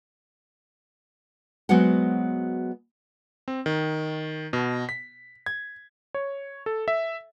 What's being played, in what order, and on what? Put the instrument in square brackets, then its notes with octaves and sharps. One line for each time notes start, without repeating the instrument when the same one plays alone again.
[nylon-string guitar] F#3 G#3 B3 F#4 C5 F#5
[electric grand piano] C4
D#3
B2
B6
G#6
C#5
A4
E5